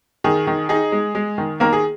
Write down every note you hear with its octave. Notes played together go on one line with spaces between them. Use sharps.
D#3 G#4
D#3
D#4 G#4
G#3
G#3
D#3
D#3 A#3 A#4
G#4